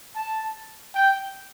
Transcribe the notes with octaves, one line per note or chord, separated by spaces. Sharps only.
A5
G5